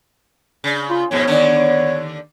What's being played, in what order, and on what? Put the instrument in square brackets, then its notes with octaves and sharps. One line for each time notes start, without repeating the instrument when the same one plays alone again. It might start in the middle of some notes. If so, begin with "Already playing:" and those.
[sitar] C#3
[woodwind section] F4
[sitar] F2 G#2 B2 [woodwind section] B3 C#5
[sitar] D#2 D3 D4